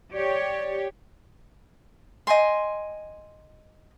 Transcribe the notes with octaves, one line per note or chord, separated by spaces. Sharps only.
G4 C#5 D5
D#5 G5 G#5 C6